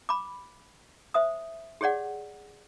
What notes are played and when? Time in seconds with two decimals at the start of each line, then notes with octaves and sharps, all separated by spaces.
0.09 B5 D6
1.14 C5 E5 D#6
1.81 G4 G#4 C#5 D5 F#5